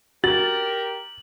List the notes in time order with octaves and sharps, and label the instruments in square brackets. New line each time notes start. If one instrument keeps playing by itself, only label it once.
[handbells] F#4 [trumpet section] G4 A#4 [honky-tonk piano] A6 [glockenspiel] F#7